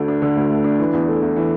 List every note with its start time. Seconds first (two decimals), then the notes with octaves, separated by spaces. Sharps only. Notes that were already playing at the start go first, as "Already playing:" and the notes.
Already playing: D2 D3 A3
0.08 D4
0.22 D3
0.37 D2
0.50 A3
0.64 D4
0.79 E3
0.93 E2
1.08 A3
1.22 E2
1.36 E3